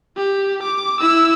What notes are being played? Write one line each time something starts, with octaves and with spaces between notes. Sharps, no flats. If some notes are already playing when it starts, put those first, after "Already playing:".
G4
D6
E4 E6